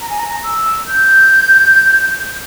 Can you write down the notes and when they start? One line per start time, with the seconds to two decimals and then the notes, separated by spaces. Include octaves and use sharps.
0.01 A#5
0.10 G#5
0.19 A#5
0.44 E6
0.88 G6